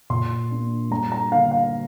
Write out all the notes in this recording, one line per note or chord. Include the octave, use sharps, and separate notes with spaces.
A#2 C6
A#3 D4
G2 A#5
A#5
D3 A#3 D4 F5
F5